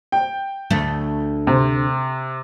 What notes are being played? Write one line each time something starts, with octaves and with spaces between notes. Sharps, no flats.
G5
D2 A3
C3